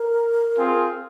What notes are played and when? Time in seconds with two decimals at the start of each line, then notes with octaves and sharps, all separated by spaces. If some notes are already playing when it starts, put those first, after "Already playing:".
Already playing: A#4
0.56 C4 F4 G#4